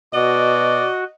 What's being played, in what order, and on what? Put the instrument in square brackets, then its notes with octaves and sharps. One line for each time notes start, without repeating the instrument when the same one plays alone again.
[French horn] B2 [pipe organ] F#4 [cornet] D5 [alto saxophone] D#5